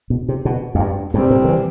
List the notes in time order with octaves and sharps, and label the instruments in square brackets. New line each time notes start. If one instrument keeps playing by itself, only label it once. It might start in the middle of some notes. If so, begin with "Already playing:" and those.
[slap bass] B2
C3
B2
F2
G2
[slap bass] G2 [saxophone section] C3 G3 C4
[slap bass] A2
D3
E3